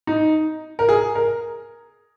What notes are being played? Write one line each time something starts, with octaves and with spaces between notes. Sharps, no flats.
D#4
A#4
G#4
A#4